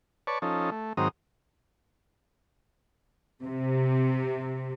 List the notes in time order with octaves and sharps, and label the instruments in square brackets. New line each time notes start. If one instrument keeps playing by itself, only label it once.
[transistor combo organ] B4 C#5 D5 A5 C#6
F3 C#4 D#4 A4
A3
G#2 D#3 F#3 C4 A#5 D#6
[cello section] C3